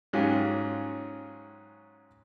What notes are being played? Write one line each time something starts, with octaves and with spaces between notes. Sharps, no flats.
G#2 F#3 C#4 F4 G4